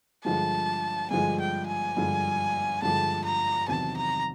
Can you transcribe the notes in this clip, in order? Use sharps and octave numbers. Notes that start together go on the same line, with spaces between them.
G2 D3 F3 G#3 A5
G2 D3 F3 G#3 G#5
G5
G#5
G2 D3 F3 G#3
G2 D3 F3 G#3 A5
A#5
E2 C3 D#3 F#3 A5
A#5